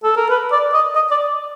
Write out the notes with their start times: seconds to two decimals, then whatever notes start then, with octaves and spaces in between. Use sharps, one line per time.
0.04 A4
0.17 A#4
0.30 B4
0.52 D5
0.73 D#5
0.95 D#5
1.11 D5